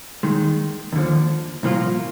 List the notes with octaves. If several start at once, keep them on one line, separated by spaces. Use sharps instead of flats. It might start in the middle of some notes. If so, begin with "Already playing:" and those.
D#2 D#3 G#3
D#2 D3 F3
C2 A#2 F3 A#3 F4